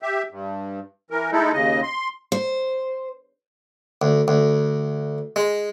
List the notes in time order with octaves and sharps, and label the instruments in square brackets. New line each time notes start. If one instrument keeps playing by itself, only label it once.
[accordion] G4 E5
G2
E3 A#4
G#3 A3 D#4 E4 A4
D#2 C#3 D#5
C6
[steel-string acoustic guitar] C5
[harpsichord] D2
D2
G#3